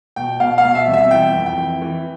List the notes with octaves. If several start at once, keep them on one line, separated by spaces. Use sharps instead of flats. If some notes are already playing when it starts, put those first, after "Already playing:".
B2 G5
B2 F5
F5
B2
E5
C2
E5
E3 G5
F2
G5
E3
E3